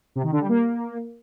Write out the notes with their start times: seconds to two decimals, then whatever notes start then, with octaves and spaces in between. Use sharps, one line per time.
0.15 C3
0.24 D#3
0.32 D3
0.41 G3
0.49 A#3